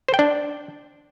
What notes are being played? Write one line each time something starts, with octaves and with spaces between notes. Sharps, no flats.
C5
G5
D4